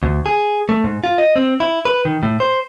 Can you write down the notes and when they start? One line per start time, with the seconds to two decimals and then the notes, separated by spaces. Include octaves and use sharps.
0.03 D2
0.26 G#4
0.69 A3
0.84 G#2
1.04 F4
1.18 D#5
1.36 C4
1.60 E4
1.85 B4
2.05 D#3
2.23 A2
2.40 C5